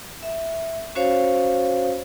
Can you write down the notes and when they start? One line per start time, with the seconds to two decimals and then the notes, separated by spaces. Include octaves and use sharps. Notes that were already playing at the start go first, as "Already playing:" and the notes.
0.23 E5
0.95 C#4 F#4 C5 C#5 F5